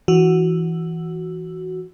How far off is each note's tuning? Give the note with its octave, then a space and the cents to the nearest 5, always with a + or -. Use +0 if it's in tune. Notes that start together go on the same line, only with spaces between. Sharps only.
E3 +0 F#4 +0